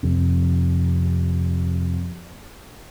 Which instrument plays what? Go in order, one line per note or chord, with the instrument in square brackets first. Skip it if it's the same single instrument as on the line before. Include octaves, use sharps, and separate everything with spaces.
[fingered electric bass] F2 C3